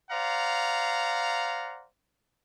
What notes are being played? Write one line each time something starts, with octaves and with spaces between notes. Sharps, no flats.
C5 D5 F5 F#5 A#5